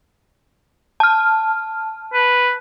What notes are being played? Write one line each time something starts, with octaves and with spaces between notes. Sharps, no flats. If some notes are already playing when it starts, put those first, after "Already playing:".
A5 F6
B4